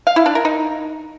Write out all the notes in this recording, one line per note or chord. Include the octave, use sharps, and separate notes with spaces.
F5
E4
D4
A#4
D#4